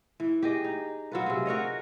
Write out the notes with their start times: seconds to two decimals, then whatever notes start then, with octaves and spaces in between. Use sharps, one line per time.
0.20 E3
0.43 G4 G#4 D#5
0.64 D#4
1.12 F#3 F4 B4
1.26 C3 G#4
1.46 F#4 A#4 C#5 D#5